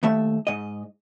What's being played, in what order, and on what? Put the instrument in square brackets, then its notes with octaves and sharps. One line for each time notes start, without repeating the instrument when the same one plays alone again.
[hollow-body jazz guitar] D#2 A3 E5
G#2 D#5